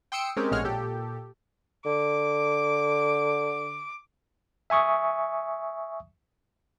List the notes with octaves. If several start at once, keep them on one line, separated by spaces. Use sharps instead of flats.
G5 C6 D#6 E6 C#7 D7
G#3 C4 C#4 G4 G#4 A#4
A#1 A2 G#3 C#5 F#5 F6
A#2 G4 A4
D3 D6
E5 G#5 C#6 D#6